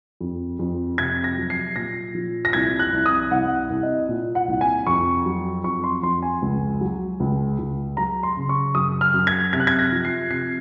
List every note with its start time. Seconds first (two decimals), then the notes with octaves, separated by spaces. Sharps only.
0.21 F2
0.59 F2
0.98 C3 G#6
1.24 A#6
1.37 F#3
1.50 C7
1.76 A#2 A#6
2.15 F3
2.45 A#6
2.53 C2 G#6
2.79 F#6
2.92 C2
3.06 D#6
3.31 C2 F#5
3.70 C2
3.83 D#5
4.09 A#2
4.35 F#5
4.48 C2
4.61 G#5
4.87 F2 C#6
5.26 F#3
5.64 F2 C#6
5.84 C6
6.03 F2 C6
6.22 G#5
6.42 C#2
6.81 F#3
7.20 C#2
7.59 C#2
7.97 F#3 A#5
8.23 C6
8.37 C#3
8.49 C#6
8.75 F#2 D#6
9.01 F6
9.14 F#2
9.27 G#6
9.53 C3 G#6
9.60 F#6
9.67 G#6
9.79 A#6
9.92 F3
10.05 C7
10.30 C3 C7